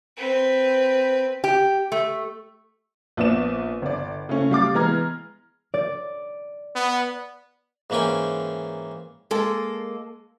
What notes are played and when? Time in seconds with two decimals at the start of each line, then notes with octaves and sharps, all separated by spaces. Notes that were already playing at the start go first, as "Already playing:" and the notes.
0.17 C4 B4
1.44 G4
1.92 A3
3.17 A#1 B3 D5 E7
3.82 G1 D5
4.29 C#3 A3 C#4
4.51 G3 F5 D6 A6
4.74 E3 G#3 B3 A#5 F6 G#6
5.74 D5
6.76 B3
7.90 G#2 E3 A#3 C#4 G5 G#5
9.31 G#3 A#3 A4